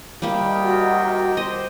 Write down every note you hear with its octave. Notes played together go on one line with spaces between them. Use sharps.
C2 D#3 G3 A#3 G4 G5
F#4
C5 D#5